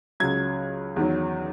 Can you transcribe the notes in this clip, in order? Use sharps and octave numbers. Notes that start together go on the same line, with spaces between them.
C#2 C#3 F#3 G#6
E2 D#3 F#3